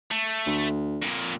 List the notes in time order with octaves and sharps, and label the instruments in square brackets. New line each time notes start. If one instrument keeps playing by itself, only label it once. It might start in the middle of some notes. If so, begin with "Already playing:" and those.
[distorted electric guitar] A3
[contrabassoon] D2
[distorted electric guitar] F2 A#2